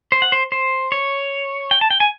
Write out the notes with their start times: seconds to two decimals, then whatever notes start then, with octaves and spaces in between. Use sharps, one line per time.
0.12 C5
0.22 F#5
0.32 C5
0.52 C5
0.92 C#5
1.71 G5
1.81 A5
1.91 G5
2.00 G#5